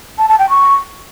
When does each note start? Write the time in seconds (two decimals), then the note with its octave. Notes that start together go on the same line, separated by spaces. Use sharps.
0.18 A5
0.29 A5
0.39 G5
0.49 C#6